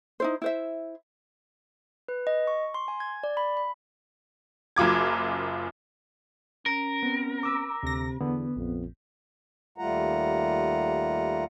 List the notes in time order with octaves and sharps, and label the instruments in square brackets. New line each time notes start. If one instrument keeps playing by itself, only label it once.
[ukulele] D#4 E4 C5
E4 C5 E5
[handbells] B4
D#5
C#6
C6
G#5
G#6
D5
B5
B5
[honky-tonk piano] F#1 F#2 F4 D6 G#6
[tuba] C#4 [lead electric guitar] A#4
[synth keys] B3 C4
[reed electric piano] D6 E6
[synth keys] D2 A#6 [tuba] C3
[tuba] E2 [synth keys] D3 [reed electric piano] B3
[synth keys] A#1 [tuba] F2
[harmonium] D#2 G3 A3 F4 F#5 A#5